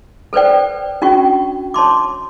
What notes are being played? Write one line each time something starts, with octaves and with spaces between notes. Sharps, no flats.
A4 B4 C5 D5 G5
C#4 D4 F#4 G5 C#6
C#5 A5 C6 D6